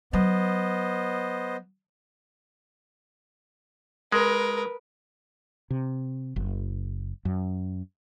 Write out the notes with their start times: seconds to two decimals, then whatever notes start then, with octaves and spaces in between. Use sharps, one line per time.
0.13 F#3 B3 C5 D#5
4.12 G#3 A#4 B4
5.70 C3
6.36 F#1
7.25 F#2